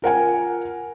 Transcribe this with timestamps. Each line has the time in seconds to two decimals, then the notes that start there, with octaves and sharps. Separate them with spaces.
0.02 F4 A#4 F#5 G#5